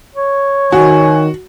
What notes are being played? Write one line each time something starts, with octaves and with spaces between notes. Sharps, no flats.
C#5
D#3 F#4 G#5